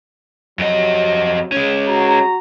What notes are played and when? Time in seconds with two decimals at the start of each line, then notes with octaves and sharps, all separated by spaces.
0.59 F2 C3 F#3 D#5
1.52 G#3 C#4
1.88 F#4 A#5